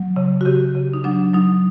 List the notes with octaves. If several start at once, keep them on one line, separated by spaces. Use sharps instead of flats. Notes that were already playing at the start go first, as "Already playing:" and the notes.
Already playing: F#3
C#3
F#4
C#3 G4
C#3
D#4
F#3 D4
F#3 D#4